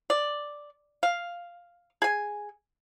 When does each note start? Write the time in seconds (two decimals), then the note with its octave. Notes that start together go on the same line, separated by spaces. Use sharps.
0.10 D5
1.03 F5
2.02 G#4 G#5